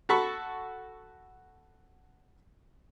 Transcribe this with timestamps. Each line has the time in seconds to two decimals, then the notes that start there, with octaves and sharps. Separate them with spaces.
0.09 F#4 A4 B5 C#6